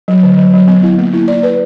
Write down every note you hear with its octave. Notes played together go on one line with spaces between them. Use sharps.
F#3
D3
F#3
F#3
B3
E4
A#3
E4
D5
B4